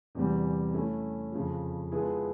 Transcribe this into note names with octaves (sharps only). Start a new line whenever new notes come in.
E2 C3 E3 G3
A3 C#4 E4
F2 C#3 F3
F3 G#3 B3 E4 G#4